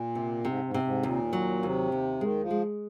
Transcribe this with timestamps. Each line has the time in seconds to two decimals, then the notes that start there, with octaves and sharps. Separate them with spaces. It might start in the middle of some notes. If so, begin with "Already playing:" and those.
Already playing: A#2
0.15 C3
0.44 G#2 C3
0.65 G#2
0.74 C3
0.83 G#2
1.03 D#2 A#2
1.33 F#3
1.62 D#2 C3
1.92 D#2
2.21 D#3 G#3
2.42 F3
2.50 G#3